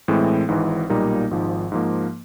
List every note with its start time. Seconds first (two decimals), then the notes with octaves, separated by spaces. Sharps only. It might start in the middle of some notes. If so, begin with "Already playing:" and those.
0.08 A2 E3 G#3 C4
0.48 G#1 G#2 E3
0.90 B1 A#2 G3 A#3 D#4
1.31 G#1 G#2 F3
1.72 G#2 F3 A#3